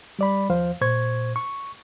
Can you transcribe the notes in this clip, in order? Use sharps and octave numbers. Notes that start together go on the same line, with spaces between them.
G3 D5 B5
D#2 F3 C5 F5
A#2 C5 C#6 G#6
C#6